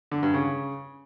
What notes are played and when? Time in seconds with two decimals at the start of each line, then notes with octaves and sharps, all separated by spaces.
0.12 D3
0.23 G2
0.34 C#3